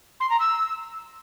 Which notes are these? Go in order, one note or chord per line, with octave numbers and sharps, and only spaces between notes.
C6
A#5
E6